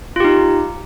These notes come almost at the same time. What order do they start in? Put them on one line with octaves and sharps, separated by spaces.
F4 G4 D#4